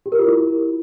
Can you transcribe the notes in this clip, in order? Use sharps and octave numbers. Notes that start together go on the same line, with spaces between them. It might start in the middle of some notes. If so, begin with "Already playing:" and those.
G4
A#4
F4
E4